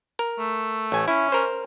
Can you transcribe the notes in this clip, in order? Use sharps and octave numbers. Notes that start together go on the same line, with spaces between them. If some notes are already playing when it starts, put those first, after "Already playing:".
A#4
A3
A1 G#5
C#4 E4
A#4 C5